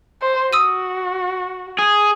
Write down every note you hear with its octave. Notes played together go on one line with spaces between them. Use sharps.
C5
F#4 D#6 E6 D#7
G#4